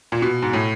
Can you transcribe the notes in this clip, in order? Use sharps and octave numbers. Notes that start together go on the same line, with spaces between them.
A#2
B2
G#2
A2